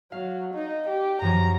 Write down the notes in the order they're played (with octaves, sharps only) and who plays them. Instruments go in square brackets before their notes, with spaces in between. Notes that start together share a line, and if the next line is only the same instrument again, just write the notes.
[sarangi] F#3 [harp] F5
[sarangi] D#4
G4
[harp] F#2 F3 C#5 [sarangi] A#5